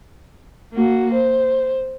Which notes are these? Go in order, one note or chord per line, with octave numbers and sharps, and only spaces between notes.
A#3 F#4
C5